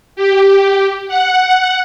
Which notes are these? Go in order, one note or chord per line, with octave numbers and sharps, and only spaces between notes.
G4
F#5